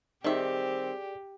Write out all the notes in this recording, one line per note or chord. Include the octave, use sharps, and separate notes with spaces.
D#3 G3 C4 G4 G#4 D5 E5